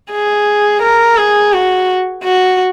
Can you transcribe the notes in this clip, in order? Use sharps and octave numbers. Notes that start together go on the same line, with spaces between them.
G#4
A#4
G#4
F#4
F#4